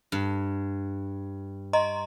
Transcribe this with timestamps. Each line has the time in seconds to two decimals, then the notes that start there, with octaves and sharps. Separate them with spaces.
0.12 G2
1.73 D#5 A#5 C6